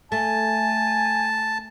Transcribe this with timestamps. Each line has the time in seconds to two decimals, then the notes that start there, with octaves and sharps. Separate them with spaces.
0.12 A3 G#5 A5